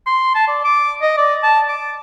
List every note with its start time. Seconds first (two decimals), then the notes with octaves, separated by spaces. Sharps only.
0.06 C6
0.35 A5
0.47 D5
0.64 D6
1.02 D#5
1.17 D5
1.43 A5
1.68 D6